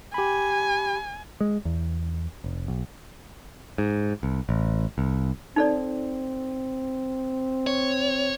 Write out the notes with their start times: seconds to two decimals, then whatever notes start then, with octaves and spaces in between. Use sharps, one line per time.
0.14 G4 G#5 B5
1.41 G#3
1.65 E2
2.44 F1
2.68 B1
3.78 G#2
4.23 C2
4.49 A1
4.98 C2
5.56 C4 D#4 A4 D5
7.67 C#5